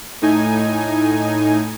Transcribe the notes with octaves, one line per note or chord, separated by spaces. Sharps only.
A2 D#4 G#5